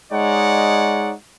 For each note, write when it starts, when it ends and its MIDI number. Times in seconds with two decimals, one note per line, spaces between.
0.12 1.13 56
0.12 1.13 63
0.12 1.13 73
0.12 1.13 74
0.12 1.13 78